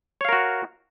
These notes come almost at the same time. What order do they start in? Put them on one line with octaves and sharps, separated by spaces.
C#5 F5 A#4 F#4